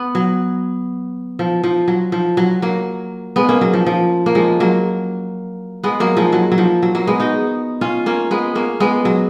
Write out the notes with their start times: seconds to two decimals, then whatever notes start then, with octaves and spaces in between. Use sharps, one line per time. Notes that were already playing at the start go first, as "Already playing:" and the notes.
Already playing: B3
0.15 F#3
1.39 F3
1.63 F3
1.88 F#3
2.12 F3
2.37 F#3
2.62 F#3 A#3
3.36 G#3 B3
3.49 A#3 C#4
3.61 F#3
3.73 F3
3.86 F3
4.26 A#3
4.35 F3 G#3
4.60 F#3 A#3
5.83 G#3 B3
6.00 F#3 A#3
6.17 F3 G#3
6.33 F#3
6.52 F#3
6.58 F3
6.83 F#3
6.95 F#3 A#3
7.07 G#3 B3
7.20 D#4 F#4
7.81 C#4 F4
8.06 A#3 C#4
8.31 G#3 B3
8.55 A#3 C#4
8.80 G#3 B3
9.05 F#3